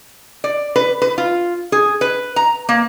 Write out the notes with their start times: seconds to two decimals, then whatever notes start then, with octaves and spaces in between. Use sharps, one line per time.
0.44 D5
0.76 B4
1.02 B4
1.18 F4
1.72 G#4
2.01 B4
2.36 A#5
2.69 A#3